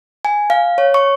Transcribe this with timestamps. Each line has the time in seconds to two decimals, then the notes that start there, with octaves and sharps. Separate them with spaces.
0.25 G#5
0.50 F5
0.78 C#5
0.94 C#6